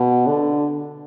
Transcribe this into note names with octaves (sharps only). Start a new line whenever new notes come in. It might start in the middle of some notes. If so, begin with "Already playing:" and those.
Already playing: B2
D3